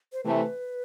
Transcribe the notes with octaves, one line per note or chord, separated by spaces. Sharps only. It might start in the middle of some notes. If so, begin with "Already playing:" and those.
C5
C3 E3 A3 B4